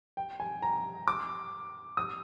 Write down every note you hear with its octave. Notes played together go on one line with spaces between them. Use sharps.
G5
G#5
A#5
D6
D#6